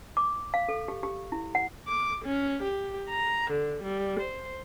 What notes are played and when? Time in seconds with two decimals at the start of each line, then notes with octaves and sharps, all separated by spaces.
0.17 D6
0.54 F5
0.69 A4
0.88 G4
1.03 G4
1.32 E4
1.55 F#5
1.88 D6
2.25 C#4
2.63 G4
3.10 A#5
3.51 D3
3.83 G3
4.20 C5